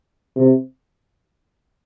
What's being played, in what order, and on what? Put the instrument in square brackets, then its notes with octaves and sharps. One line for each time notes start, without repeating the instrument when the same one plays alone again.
[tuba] C3